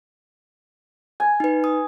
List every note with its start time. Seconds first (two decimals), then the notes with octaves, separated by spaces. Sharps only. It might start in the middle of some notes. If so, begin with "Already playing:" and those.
1.20 G#5
1.40 D#4 B4
1.64 D#6